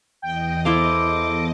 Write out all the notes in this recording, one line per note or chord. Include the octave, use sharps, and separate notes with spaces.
E2 D#5 G5
E4 A4 C5 F5 D6